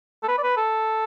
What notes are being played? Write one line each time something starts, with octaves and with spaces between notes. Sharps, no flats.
A4
B4
D5
B4
A4